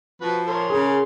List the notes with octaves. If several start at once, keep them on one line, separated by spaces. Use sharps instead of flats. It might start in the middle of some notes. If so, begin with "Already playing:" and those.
F3 F#4 B4
A#4 C#5 C6
C#3 G#4